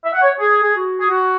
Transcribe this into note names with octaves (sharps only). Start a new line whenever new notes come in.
E5
F#5
C#5
G#4
G#4
F#4
G#4
F#4